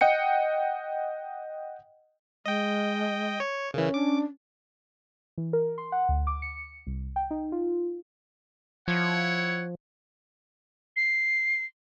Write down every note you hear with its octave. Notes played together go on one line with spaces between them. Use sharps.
D#5 F#5 G5 C#7
G#3 D#5 G5
C#5
C#3 E3 C#4 A#4
D4 D6
E3
A#4
C6
F#5
D2
D6
C#7
C2
G5
D#4
F4
F3 E4 C#5 F#5
C7